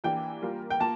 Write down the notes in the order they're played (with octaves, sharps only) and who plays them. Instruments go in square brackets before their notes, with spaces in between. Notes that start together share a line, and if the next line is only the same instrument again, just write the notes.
[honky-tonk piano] E3 A#3 D4 G4 [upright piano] G5
[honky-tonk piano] G3 A#3 F4 A#4
[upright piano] G5
[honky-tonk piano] A#3 F4 [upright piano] A5